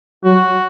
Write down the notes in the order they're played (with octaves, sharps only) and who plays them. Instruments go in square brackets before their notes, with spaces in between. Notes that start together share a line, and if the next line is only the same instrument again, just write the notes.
[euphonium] F#3 [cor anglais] F#4